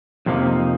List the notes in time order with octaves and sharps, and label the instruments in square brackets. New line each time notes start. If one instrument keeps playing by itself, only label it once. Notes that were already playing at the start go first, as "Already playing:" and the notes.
[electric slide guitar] F2 C3 F3 A#3 D#4